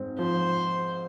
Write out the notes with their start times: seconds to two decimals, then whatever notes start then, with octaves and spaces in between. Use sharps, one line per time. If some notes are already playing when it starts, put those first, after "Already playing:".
Already playing: G#2 C4
0.19 F3 C5